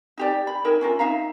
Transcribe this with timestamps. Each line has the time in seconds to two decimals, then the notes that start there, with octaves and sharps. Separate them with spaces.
0.18 D#4 G4 D5
0.47 B5
0.64 D#4 E4 A#4 G5
0.81 C#4 F4 A#4
0.99 D#4 E5 F5 A#5